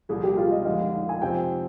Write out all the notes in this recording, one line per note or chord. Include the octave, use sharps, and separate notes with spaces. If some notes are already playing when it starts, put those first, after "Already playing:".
C2 A#2 F3 G#4
G4
F4
D#5
F2 D3 G#3 F5
G#5
F2 C3 F3 C4 G5